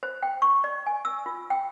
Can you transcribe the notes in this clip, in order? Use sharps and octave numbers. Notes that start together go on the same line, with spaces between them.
C5
G5
C#6
D5
G#5
E6
F4
G5